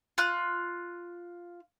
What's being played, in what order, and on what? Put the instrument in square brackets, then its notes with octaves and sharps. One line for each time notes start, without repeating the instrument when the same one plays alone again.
[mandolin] F4 F#6